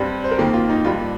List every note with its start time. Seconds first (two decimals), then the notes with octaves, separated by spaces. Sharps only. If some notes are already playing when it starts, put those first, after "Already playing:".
Already playing: G2 G3 C4
0.24 C5
0.31 A#4
0.38 F2 D#3 A#3 G4
0.54 F4
0.69 D#4
0.85 G2 G3 A#3 F4